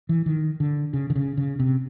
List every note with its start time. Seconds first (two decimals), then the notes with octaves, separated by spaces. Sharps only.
0.09 E3
0.26 D#3
0.60 D3
0.93 C#3
1.10 D3
1.16 C#3
1.37 C#3
1.60 C3